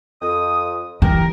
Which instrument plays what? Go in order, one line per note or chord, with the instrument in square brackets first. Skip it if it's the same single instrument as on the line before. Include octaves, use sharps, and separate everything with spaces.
[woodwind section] F2 D#6
[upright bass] E3 [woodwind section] G4 A#4